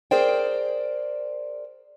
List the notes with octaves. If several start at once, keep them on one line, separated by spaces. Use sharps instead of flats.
G#4 A#4 C5 D5 G5